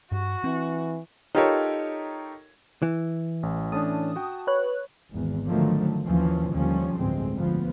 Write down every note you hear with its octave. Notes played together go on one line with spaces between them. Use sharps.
G2 F#4
E3 C4
D#4 F4 G4 A4 A#4 C#5
E3
A1
A2 C#4 D4 A5 D#6
F#4 G5
B4 C#5 F#6
G#1 E2
D3 D#3 F3 F#3 A3
D#2 E3 F3 C#4
D#2 D3 D#3 F3 G3 C#4
A1 D2 G2 G#3 C4
D2 F3 B3